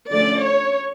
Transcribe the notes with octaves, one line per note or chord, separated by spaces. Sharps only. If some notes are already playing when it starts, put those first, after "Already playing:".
D3 F3 A3 C#4 D5
C#5